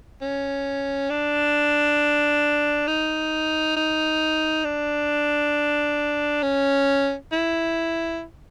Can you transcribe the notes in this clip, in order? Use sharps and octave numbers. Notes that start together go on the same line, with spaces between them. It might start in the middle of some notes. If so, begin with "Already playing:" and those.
C#4
D4
D#4
D#4
D4
C#4
E4